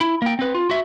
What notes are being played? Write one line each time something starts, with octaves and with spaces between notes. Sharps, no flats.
E4
A#3 G5
C4 B4
F4
F#4 E5